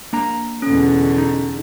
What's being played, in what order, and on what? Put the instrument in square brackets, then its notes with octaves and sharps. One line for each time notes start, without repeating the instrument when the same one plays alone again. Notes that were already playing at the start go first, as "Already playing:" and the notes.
[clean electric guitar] A#3 D4 A#5
[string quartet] E2 B2 D3 [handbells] C#4
[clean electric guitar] D#4